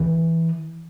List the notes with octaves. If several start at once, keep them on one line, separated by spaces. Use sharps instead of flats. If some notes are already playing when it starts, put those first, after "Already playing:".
Already playing: E3